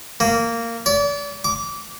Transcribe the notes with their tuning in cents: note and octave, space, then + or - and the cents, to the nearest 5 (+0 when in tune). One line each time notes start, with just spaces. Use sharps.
A#3 -15
D5 -35
D6 -25